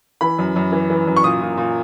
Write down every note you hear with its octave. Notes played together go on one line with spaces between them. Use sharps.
E3 B5
F#2
F#2
E3
E3
F#2
C#6
A#2 D#6
A#2
A#2